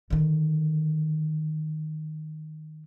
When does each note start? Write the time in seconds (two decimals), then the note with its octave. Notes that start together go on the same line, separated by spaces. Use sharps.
0.10 D3 D#3